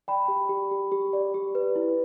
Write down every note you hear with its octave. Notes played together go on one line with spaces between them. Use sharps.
D5 G5 B5
G4
G4
G4
G4
D5
G4
B4
E4